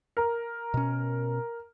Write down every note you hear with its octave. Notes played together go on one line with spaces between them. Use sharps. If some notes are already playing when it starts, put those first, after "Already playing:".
A#4
B2 C#4